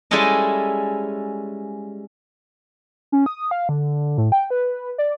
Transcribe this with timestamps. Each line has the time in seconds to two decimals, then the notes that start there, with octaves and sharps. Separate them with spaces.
0.11 G3 G#3 C#4 E4 A4 D#5
3.12 C#4
3.26 D#6
3.51 F5
3.69 D3
4.18 A2
4.32 G5
4.50 B4
4.98 D5